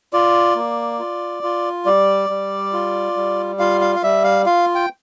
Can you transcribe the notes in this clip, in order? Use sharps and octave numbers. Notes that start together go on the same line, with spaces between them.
F4 D5
A#3
F4
F4
G3 D5
G3
F4
G3
F4 F5
F5
F5
G3 E5
F5
F4 F5
G5